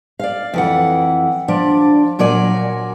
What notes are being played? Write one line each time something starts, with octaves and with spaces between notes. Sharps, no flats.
D5 F5
F2 E3 F#5
F3 D4 D5
A#2 F#3 A#3 D5 G#5